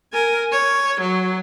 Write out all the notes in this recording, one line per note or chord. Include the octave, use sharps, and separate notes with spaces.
A#4 G#5
C#5
F#3